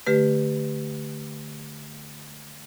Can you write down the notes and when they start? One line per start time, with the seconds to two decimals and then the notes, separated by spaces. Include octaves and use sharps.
0.07 D3 A3 G4 B4